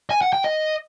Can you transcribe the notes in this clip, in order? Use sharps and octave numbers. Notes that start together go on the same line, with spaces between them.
G#5
F#5
G5
D#5